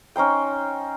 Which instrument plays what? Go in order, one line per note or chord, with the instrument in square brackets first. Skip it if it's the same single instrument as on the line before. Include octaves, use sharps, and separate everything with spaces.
[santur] C#4 D#4 C5 G5